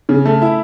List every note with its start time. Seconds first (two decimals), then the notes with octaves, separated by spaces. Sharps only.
0.09 C#3
0.25 A3
0.42 E4